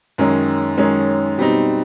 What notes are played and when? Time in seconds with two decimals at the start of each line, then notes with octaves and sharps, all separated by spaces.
0.18 F#2 D#3 G#3 C#4
0.78 F#2 D#3 G#3 C#4
1.38 B2 G3 C4 D#4